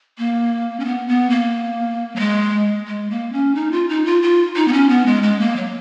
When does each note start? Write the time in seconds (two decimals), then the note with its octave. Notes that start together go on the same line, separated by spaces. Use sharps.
0.18 A#3
0.80 C#4
0.85 B3
1.08 B3
1.30 A#3
2.16 F#3
2.20 G#3
2.87 G#3
3.10 A#3
3.32 C#4
3.55 D#4
3.72 F4
3.89 D#4
4.05 F4
4.22 F4
4.56 D#4
4.68 B3
4.73 C#4
4.89 B3
5.06 G#3
5.23 G#3
5.40 A#3
5.56 F#3